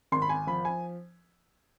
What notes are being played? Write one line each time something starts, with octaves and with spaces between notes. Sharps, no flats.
G#1 C6
B5
G#5
F3 B5
G#5